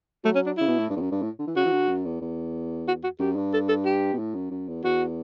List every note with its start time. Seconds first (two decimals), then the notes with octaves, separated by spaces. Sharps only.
0.24 F#3 A3
0.35 C#4
0.46 D4
0.57 C#3 E4
0.68 B2
0.79 A2
0.90 G2
0.96 E2
1.00 F#2
1.12 G2
1.22 A2
1.39 D3
1.48 E3
1.56 C#3 F#4
1.65 E3
1.72 D3
1.88 F#2
2.06 E2
2.21 E2
2.88 F#4
3.04 F#4
3.20 F#2 G4
3.36 G2
3.53 A4
3.69 A4
3.85 G4
4.14 B2
4.19 A2
4.35 F#2
4.51 F#2
4.68 E2
4.84 E2 F#4